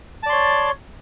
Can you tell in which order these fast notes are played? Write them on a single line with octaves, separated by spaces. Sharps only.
A5 D5 C6 C#5